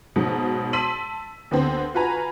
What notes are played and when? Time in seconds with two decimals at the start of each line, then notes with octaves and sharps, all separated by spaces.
0.16 G#2 B2 F#3
0.73 A5 C6 E6 B6 D#7 F#7
1.51 D2 B3 C4
1.95 F4 F#4 B4 G#5 A#5